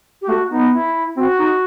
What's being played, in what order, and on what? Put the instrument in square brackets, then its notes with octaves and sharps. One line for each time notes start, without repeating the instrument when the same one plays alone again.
[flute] G4
[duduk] A3 [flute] F#4
[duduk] B3 [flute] D#4
[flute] E4
[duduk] C4 [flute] F#4
[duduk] D#4